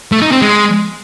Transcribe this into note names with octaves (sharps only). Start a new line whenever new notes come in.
A3
D#4
C4
G#3